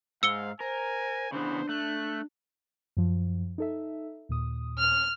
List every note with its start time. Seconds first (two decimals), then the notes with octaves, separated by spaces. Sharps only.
0.23 G#2 F5 E6 C#7 G7
0.60 A#4 C5 G#5
1.32 C#3 E3 B3 D4 C5
1.69 A3 F#6
2.97 F#2 F3
3.58 D#4 A4 E5
4.29 D#2 A#2 D#6
4.78 F6